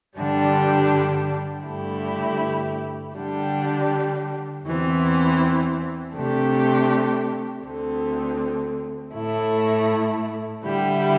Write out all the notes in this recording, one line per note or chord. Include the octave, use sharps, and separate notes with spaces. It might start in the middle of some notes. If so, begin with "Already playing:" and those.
G2 D3 G3 D4 G4
G2 D3 A3 E4 G4
D3 G3 D4 G4
E2 E3 C4
C3 A3 D4 G4
D2 D3 C4
A2 A3 E4
D3 G3 E4 G4